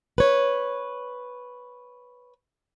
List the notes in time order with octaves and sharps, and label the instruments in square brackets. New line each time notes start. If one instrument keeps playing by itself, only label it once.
[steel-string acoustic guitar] B4 C#5